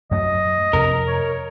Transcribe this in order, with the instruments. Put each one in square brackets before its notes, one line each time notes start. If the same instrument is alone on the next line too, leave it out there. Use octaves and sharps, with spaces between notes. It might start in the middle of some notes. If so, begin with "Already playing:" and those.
[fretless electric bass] F#2 F#3 A3 [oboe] D#5
[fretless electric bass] F2 C3 [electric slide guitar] A#4
[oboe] C#5